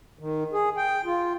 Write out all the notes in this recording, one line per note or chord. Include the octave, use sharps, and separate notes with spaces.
D#3
G#4
G5
F4